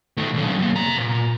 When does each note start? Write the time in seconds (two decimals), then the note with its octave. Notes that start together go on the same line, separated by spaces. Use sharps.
0.17 D#3 A3
0.34 B1 C#3
0.59 F#2 A#3
0.75 C3 A#5
0.98 A#2